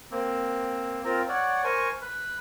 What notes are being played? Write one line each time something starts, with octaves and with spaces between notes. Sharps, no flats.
A#3 C4
C4 F4 A#4
C#5 D5 F#5
A#4 C5 G#5 C#6
B4